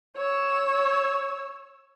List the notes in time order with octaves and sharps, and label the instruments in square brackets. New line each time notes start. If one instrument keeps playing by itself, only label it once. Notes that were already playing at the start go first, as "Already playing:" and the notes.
[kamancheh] C#5 E6